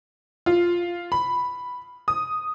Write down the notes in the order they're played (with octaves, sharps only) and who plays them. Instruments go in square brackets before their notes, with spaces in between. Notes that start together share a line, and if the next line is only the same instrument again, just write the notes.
[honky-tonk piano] F4
B5
D#6